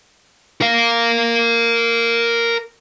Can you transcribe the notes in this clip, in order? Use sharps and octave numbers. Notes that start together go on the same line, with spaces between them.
A#4 F5